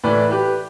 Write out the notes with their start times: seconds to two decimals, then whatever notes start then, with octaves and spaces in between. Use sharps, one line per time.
0.04 A2 E3 B4 D5
0.31 G4 B4